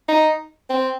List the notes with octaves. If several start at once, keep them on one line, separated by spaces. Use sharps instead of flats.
D#4
C4